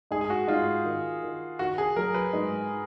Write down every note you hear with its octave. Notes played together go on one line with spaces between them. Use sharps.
G#2 G#4
G#4
F#4
G#2 F4
D#3
D#3
D#3 F#4
G#4
F#3 A#4
B4
G#2